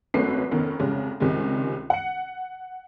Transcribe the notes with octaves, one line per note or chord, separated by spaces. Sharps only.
G#1 F#2 A3 C#4 B4 C7
F1 D#3 B3 C#4
C2 F2 C#3 G3 G#3
C#2 C3 D#3 G3 G#3
F#5 C#7